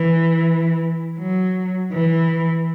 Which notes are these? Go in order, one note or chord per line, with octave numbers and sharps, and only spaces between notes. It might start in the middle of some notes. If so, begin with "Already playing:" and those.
Already playing: E3
F#3
E3